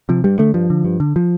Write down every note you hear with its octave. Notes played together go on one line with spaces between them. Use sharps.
C3 F3
G2 G3
D3 A3
G2 F3
D3
G2
D3
F3